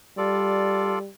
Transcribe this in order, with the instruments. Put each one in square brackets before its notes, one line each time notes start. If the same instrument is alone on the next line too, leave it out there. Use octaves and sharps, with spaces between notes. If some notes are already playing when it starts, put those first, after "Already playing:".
[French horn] G3 [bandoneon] F4 A4 D5